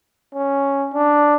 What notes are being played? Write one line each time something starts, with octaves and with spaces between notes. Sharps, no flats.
C#4
D4